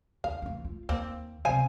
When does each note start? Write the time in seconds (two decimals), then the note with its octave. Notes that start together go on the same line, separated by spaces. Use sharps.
0.24 D#2 F5
0.42 E3 A3
0.65 F4
0.89 D#2 A#3 C4
1.45 C3 C4 C5 F5 G#5